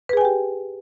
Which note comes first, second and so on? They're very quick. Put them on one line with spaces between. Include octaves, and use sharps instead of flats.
B4 G#4 G#5 G5 G4